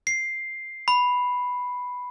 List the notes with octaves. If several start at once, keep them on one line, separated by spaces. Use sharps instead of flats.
C7
B5